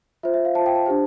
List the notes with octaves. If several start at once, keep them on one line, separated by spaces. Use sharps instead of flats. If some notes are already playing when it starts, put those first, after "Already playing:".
F4 C5 E5
E5
F5
F4 C5 A5
G5
A5
D4 G4 C5